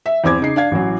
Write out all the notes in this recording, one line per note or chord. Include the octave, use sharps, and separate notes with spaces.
E5
E2 C4 D6 G#6
C#3 D#4 C7
D4 F5 G#6
A1 E3 F#3